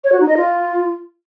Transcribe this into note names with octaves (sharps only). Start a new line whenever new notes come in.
C#5
F#4
D#4
D#5
F4